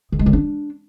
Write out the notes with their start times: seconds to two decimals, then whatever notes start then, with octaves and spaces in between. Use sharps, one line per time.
0.12 D#3
0.19 G#3
0.26 D#3
0.33 D4